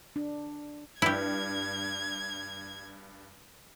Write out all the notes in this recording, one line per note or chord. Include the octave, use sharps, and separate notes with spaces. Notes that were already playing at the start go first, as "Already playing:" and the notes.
D4
G2 E4 G4 G#6